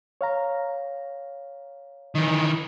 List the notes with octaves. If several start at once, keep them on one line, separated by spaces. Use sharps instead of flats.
C#5 F5 A#5
D#3 E3